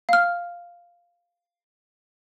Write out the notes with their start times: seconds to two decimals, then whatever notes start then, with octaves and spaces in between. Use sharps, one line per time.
0.09 F5 F6